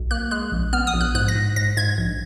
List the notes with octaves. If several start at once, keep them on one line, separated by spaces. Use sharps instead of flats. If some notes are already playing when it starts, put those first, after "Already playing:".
Already playing: B1
A#3 F#6
G#3 F#6
A#1
B3 F6
D#6
A#1
F#6
G#2 F#6
A#6
G#2
G#2 A#6
G#2 G#6
A#1